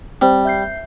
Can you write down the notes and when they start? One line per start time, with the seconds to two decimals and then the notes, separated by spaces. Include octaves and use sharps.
0.22 G3 C4 C5
0.45 E5 G6 C7